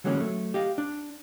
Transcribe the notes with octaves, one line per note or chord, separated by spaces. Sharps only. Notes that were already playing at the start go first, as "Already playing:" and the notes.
D3 E3 F#3 G#3 A#3 C#4
F#3 A3
G4 D#5 F5
D4